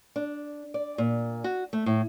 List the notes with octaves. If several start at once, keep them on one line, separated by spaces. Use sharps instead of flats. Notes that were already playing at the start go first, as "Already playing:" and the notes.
D4
D5
A#2
F#4
A3
A2